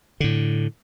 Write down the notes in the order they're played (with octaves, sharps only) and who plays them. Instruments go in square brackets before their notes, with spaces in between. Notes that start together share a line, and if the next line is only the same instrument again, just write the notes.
[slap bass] A2 D3